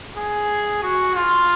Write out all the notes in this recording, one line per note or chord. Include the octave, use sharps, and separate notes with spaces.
G#4
F#4
F4